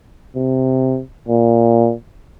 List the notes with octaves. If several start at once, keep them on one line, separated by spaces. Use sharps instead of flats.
C3
A#2